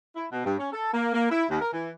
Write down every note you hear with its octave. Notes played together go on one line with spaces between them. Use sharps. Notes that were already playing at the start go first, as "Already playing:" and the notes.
E4
B2
G2
C#4
A4
A#3
A#3
E4
D#2
A#4
E3